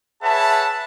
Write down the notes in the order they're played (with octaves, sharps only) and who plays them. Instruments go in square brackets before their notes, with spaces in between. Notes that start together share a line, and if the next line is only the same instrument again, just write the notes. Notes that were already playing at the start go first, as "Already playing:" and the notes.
[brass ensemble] G#4 B4 C#5 E5 F#5 A5